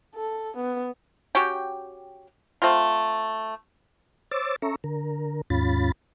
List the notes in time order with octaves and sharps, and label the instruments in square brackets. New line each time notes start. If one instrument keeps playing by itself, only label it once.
[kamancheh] A4
B3
[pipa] C#4 F#4 G4 G5
A3 C4 F4
[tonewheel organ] C5 C#5 D6 E6 A6
C#4 A4 E5 A#5 C#6
D3 A#4
D#2 G#2 C#4 F4 B5 A6